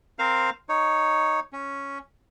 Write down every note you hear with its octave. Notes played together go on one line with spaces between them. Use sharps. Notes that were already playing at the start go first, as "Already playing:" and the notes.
C4 A#4 C5 F5 F6
D#4 C#5
C#4